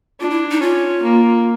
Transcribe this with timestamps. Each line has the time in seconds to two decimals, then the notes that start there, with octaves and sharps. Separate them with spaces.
0.20 D4 F4
0.31 E4
0.51 D#4
0.61 C#4 F4
1.02 A#3